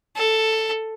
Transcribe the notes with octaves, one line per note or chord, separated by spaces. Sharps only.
A4